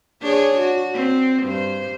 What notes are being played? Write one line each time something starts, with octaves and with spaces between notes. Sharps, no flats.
D4 G#4 C#5
F#4
C4
G2 C5